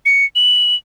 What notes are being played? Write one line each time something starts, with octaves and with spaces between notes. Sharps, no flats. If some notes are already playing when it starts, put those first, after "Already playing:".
C#7
F#7